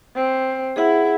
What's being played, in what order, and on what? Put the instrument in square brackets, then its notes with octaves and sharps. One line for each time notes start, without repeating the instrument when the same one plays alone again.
[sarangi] C4
[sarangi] E4 [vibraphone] G#4 F#5